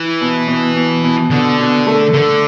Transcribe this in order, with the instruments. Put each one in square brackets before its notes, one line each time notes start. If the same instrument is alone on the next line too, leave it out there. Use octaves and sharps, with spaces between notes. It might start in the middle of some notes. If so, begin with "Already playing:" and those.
Already playing: [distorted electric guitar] E3
[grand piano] B2
B2
B2
B2
[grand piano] B2 [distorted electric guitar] D3
[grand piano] B2
A3
[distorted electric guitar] D3 [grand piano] A3